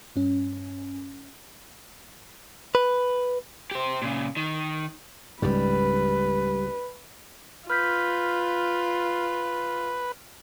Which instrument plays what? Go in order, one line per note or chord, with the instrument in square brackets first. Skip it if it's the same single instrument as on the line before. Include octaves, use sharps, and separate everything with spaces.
[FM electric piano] G2 C#4
[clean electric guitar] B4
[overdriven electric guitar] G4 C5
A#2 C#3
D#3
[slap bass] C#2 G#2 [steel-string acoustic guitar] G3 [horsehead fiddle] B4
[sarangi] F4 [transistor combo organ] B4 [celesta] F6 G6 B6